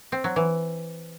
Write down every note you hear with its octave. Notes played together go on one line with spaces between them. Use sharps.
C4
F#3
E3